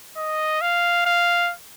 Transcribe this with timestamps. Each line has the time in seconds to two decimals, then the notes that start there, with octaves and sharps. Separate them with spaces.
0.17 D#5
0.61 F5
1.06 F5